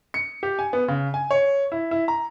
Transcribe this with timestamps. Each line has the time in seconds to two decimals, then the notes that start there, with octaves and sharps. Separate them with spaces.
0.14 C#7
0.43 G4
0.59 G#5
0.73 B3
0.88 C#3
1.14 G#5
1.31 C#5
1.72 E4
1.91 E4
2.08 A#5